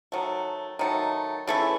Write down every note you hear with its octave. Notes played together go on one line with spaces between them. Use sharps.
D#3 F#3 A3
D#3 F#3 A3
C#3 E3 A3 E4